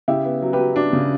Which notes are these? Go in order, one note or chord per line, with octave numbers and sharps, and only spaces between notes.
C#3 E4 G4
B3
F#3
G4 B4
F#3
F#3 D4
C#3